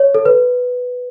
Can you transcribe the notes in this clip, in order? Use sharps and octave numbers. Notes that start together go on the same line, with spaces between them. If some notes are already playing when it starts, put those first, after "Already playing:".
Already playing: C#5
A4
B4